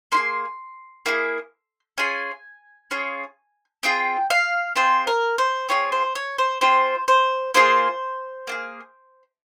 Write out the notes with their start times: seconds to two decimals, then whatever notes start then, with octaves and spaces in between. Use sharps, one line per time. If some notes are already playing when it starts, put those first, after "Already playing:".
0.12 A#3 E4 G#4 C6
1.06 A#3 E4 G#4
1.98 C#4 F4 G#4 G#5
2.91 C#4 F4 G#4
3.83 C4 F4 G#4 G5
4.30 F5
4.76 C4 F4 G#4 C5
5.07 A#4
5.38 C5
5.69 C4 F4 G#4 C#5
5.92 C5
6.15 C#5
6.38 C5
6.61 C4 F4 G#4 C5
7.08 C5
7.54 A#3 F4 G#4 C5
8.47 A#3 F4 G#4